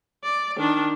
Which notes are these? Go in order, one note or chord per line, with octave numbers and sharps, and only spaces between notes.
D5
D#3 D4